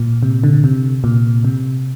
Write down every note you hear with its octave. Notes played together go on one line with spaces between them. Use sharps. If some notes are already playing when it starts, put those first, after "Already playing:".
Already playing: A#2
C3
D3
C3
A#2
C3